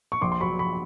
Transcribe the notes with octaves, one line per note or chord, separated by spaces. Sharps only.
C#6
A#1 C6 D6
C6
F#3 B5 C#6
A#1 B5 C#6